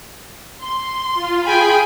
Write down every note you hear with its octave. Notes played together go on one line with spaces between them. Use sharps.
C6
F4
G#4 G5 G#5 B5